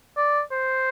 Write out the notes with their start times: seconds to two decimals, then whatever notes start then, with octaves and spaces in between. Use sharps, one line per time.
0.17 D5
0.52 C5